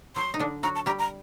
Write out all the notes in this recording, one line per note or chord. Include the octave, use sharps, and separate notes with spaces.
F#3 C6
D#4
D3 D4
F#3 F#4 A#5
A5
G3 G4 A#5
A#5